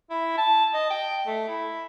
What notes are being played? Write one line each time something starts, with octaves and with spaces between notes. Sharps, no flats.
E4
A5
D#5
G5
A3
E4